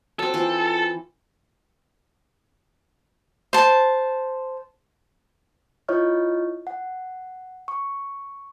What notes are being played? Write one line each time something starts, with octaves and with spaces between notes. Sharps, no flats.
F#3 C4 A4
E3 C4 F4
C5 A5
E4 F4 C#5 D#5 C#6 F6
F#5
C#6